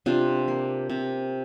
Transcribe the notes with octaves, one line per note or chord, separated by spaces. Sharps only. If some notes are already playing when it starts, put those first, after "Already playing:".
C3 D4 F4
A#3
C3